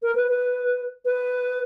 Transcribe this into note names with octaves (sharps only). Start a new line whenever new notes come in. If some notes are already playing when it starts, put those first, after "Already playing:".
A#4
B4
B4
B4